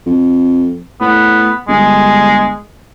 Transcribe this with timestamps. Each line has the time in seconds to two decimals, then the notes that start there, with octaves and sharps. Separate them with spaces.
0.07 F2
1.01 A2 B3
1.68 G1 G#3